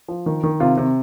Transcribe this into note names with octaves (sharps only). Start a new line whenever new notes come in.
F3
D#3
D#3
C3 F4
C3